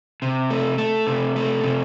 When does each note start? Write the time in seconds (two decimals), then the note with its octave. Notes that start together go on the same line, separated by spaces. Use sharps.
0.22 C3
0.50 A3
0.78 A3
1.07 C3
1.36 A3
1.64 C3